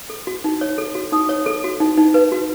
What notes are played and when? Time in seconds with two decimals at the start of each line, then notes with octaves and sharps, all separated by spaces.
0.10 A4
0.27 F#4
0.44 D#4
0.61 C#5
0.78 A4
0.95 F#4
1.12 D#4 D#6
1.29 C#5
1.46 A4
1.64 F#4
1.80 D#4
1.98 D#4
2.14 B4
2.32 F#4